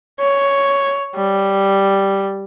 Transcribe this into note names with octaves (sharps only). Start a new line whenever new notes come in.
C#5
G3